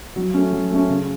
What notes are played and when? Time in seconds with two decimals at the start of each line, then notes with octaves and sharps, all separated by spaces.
0.16 F#3
0.34 A3 C#4
0.53 F#3
0.71 A3 C#4
0.89 C#3